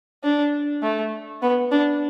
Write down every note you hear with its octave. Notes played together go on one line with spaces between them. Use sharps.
D4
A3
B3
D4